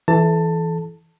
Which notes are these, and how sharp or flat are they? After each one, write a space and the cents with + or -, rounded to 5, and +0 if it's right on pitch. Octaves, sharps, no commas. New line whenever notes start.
E3 +0 A4 -30 A5 +20